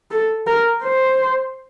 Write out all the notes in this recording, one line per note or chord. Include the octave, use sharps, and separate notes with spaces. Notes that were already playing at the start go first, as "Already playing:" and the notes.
A4
A#4
C5